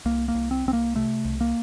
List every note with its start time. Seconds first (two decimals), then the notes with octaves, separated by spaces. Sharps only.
0.05 C2 A#3
0.28 A#3
0.35 C2
0.51 C4
0.66 C2 C4
0.73 A#3
0.95 C3 A3
1.25 C2
1.41 A#3